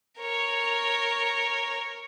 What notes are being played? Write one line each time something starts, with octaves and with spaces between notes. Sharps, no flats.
A#4 C#5